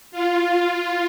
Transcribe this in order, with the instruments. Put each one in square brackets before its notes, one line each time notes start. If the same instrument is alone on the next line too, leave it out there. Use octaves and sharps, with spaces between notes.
[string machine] F4